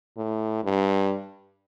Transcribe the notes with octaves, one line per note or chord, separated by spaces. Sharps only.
A2
G2